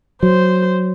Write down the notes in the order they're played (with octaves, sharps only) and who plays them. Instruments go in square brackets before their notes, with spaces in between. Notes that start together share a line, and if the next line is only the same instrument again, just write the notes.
[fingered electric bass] F#3 [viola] C5